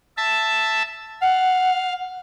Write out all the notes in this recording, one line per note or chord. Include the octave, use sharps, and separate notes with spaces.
E5 A5
F5 F#5